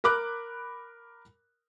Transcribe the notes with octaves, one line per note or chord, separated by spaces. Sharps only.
A#4 B5 D6 F#6